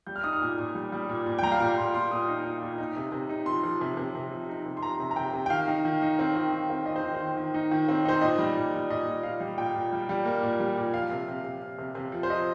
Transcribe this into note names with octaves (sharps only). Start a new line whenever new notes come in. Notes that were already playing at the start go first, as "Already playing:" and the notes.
G3 G6
F6
D#4 D#6
F6
A#2
A#2
G3
G3
A#2
A#2
G5
G3 A#5
F5
A#2 G5
A#2 C6
A#2 C6
A#2 D#6
D#4
D#4
A#2
D#4
C3
C3
D#4
F3 C6
F3
C3
C3
C3
F3
D#4
C3
C6
F3 A#5
C3
A#5
C3 G5
C3
G5
D#3 F5
D#4
D#3
D#4
C4
D#3
D#4
C4
D#3 D#5
C5
D#3
C5
D#3
D#3
D#4
D#3
C4
D#4 C5
A#2 D#5
G3
A#2
G3
A#2 D#5
A#2
A#2 F5
G3
A#2 G5
A#2
G3
G3
A#3
A#2
G3
A#2
F3 F5
C3
C3
C3
C3
C3
C3
F3
C5
F3 D#5